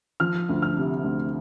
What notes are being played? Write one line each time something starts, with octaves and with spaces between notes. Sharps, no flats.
F3 F6
D2
F6
C3
D2